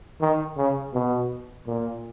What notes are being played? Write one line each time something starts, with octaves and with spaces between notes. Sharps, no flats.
D#3
C#3
B2
A#2